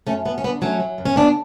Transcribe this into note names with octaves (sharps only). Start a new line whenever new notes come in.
F#2 A3 C#4
F#2 B3
C#4
D3 B3
F#3 A3 C#4
F#3
F#2
C#4
D3 B3 D4